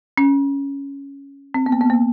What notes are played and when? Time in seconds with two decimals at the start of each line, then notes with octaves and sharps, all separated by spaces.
0.18 C#4
1.54 C4
1.66 B3
1.72 A#3
1.81 B3
1.90 A#3